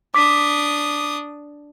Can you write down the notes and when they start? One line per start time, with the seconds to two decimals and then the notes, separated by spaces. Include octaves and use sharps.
0.14 D4 D6 D#6 B6